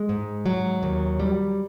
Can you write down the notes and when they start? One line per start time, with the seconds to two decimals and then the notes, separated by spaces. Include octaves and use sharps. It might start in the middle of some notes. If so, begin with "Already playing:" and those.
Already playing: G#3
0.09 G#2
0.46 F#3
0.83 D#2
1.20 G3